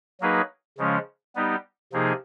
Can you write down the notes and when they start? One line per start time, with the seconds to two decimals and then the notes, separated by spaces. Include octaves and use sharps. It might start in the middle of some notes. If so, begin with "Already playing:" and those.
0.21 F#3 A#3 D#4 G#4 B4
0.78 C#3 F3 G#3 C#4
1.36 G3 B3 D#4 G4
1.93 C3 F3 A#3 D#4 G#4